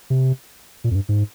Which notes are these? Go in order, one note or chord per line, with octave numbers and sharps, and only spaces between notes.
C3
A#2
F2
G2
G#2